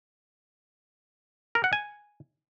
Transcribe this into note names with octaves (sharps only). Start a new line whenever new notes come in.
A#4
F#5
G#5